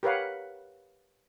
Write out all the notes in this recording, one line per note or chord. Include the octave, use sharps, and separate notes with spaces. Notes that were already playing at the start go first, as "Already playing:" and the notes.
G4 A#4 B4 C#5 F5 F#5